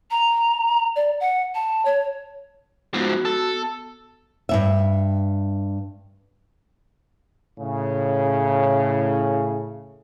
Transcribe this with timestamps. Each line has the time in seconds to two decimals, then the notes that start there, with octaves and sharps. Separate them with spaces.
0.11 A#5
0.96 D5
1.20 F#5
1.55 A5
1.85 C#5
2.94 G#2 F3 B3 F#4
3.25 A4
4.49 G2 C3 E5
7.59 A2 C#3